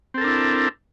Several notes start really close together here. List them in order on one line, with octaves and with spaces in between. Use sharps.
C4 A4 A#4 D4 E4